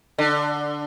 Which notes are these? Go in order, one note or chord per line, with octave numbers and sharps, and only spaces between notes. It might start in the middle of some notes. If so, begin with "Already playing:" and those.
D3